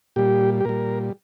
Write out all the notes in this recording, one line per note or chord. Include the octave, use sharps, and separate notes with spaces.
A#2 G3 G4
G4
A#2 G3 A#4